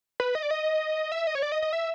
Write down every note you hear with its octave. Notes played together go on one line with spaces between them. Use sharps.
B4
D#5
D5
D#5
E5
D#5
C#5
D5
D#5
D#5
E5